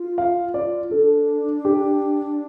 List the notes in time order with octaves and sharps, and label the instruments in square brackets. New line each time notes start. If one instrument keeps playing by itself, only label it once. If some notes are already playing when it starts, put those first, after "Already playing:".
Already playing: [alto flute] F4
[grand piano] F5
D5
[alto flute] F4
[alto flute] D4 [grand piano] A4
[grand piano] G4